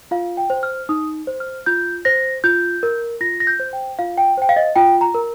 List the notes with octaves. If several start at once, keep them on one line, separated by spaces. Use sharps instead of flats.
F4 F5
G5
C5
F6
D#4 D#6
C5
F6
F4 G6
C5 A#6
F4 G6
A#4
F4 A#6
A#6
G6
C5
G5
F4 F5
G5
C5 G5
F5
D#5
F4 G5
A#5
A#4